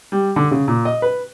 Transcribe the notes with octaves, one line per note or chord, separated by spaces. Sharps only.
G3
D3
C#3
A#2
D#5
B4